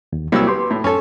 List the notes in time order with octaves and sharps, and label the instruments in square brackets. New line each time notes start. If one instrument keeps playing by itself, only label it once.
[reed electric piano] D#2
[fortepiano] C2 F#3 E6 [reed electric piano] A#3 E4
[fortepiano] G4 [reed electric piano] B4 C6 D6
[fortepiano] A2
[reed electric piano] F#2 [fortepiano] C#4 A4